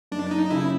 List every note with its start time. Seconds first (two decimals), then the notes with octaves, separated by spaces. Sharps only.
0.11 F#1 D4
0.31 D#4
0.51 C#3 E4